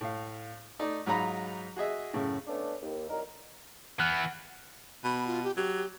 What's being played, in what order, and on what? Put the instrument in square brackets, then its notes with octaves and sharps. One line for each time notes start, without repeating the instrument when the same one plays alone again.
[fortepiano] A2 F5
A3 D#4 D5
G#2 F#3 D#4 F4 A#5 B5
F#4 G#4 D#5 E5
F#2 A2 C#3
[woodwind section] A3 B3 C#4 D4
D#2
C2 F#3 D#4 A#4
[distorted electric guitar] E3 B3 [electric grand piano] F#5 F6 F#6
[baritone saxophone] B2 [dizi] B5
[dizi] F4
G4
[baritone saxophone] F#3 [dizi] G4